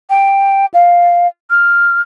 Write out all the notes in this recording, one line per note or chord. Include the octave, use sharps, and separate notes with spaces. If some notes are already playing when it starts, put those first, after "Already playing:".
G5
F5
F6